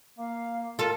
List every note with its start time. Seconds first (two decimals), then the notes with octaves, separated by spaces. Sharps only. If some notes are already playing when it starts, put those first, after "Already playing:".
0.19 A#3 F5
0.79 F4 A4 A#4